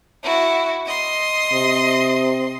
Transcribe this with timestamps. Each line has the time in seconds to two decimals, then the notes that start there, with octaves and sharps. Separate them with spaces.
0.23 E4 F#4
0.86 D#5 C6
1.52 C3